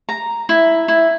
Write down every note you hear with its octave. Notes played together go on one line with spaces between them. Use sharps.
A#5
E4
E4